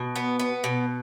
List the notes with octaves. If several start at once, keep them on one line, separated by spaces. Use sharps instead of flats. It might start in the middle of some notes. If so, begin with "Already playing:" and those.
Already playing: B2
B3
B3
B2